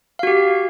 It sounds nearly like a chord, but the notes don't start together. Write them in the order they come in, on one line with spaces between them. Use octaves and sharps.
F5 F#4 G4